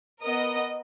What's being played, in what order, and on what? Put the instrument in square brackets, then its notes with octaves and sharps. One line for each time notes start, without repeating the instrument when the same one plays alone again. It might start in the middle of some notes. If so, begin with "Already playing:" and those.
[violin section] B3 A#4 D#5 D#6